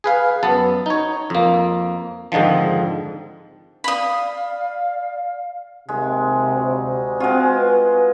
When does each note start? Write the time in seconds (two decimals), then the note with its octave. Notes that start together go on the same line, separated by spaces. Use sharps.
0.04 G#4 B4 F5
0.43 F#2 B3 A5
0.86 D#4 C#5
1.30 F2 A#3
2.32 F2 G#2 D3 D#3 F3
3.84 D5 F5 B5 D#6
5.89 D#2 C3 G#3
6.55 D2
7.20 G#3 C4 F4 F#4
7.55 B4